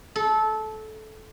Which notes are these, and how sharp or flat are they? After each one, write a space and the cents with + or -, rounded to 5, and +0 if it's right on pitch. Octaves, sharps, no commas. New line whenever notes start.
A4 -20